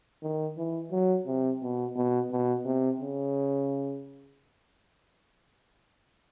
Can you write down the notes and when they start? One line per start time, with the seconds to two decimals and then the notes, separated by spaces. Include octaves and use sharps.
0.23 D#3
0.57 E3
0.92 F#3
1.27 C3
1.62 B2
1.96 B2
2.31 B2
2.66 C3
3.00 C#3